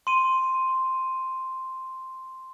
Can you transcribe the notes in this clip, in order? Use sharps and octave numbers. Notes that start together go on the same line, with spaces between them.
C6 D#7